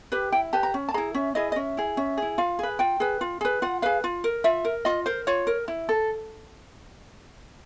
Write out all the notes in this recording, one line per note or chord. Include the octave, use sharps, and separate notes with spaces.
G4 B4
E4 G5
G4 B4 A5
A#5
C#4
A5
E4 G#4 A#5
C#4 E5
E4 G#4 D#5
D#5
C#4 E5
E4 G#4
C#4 E5
E4 G#4
F4 F5
G#4 B4
F4 G5
G#4 B4
F4
G#4 B4
F4 F#5
G#4 B4 F5
F4
A#4
F4 E5
A#4
F4 D#5
A#4 C5
F4 C#5
A#4
E4
A4